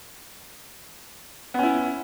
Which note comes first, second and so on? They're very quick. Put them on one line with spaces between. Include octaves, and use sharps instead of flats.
B3 C#4 E4